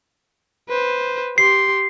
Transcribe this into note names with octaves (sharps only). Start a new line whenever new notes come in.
B4 C5
G4 C6 C7